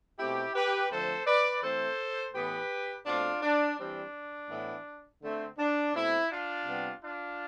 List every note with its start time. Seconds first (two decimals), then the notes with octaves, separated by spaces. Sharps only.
0.18 B2 A3 C4 E4 G4
0.54 G4 B4
0.90 D3 F3 A3 C4 A4 C5
1.26 B4 D5
1.62 E3 A3 C4 A4 C5
2.34 A2 E3 B3 G4 B4
3.06 B2 A3 C4 D4 F4
3.42 D4
3.78 E3 G3 C4 D4
4.50 A2 E3 B3
5.22 D3 A3 C4
5.58 D4
5.94 B2 A3 C4 E4
6.30 D4 F4
6.66 C3 G3 B3
7.02 D4 F4